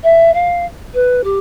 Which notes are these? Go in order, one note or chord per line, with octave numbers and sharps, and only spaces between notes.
E5
F5
B4
G4